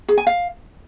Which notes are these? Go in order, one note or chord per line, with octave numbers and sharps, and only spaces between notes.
G#4
G#5
F5